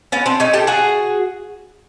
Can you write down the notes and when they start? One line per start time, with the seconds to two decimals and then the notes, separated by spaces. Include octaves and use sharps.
0.12 B3 C#4
0.26 C4 D4
0.40 C#4 D#4
0.53 G4 A4
0.67 F#4 G#4